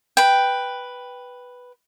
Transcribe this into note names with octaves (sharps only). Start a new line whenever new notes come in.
B4 G5